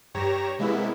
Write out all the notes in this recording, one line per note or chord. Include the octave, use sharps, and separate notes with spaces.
G2 G4 C#5 A#5 A#6 E7
C3 G#3 A#3 B3 E4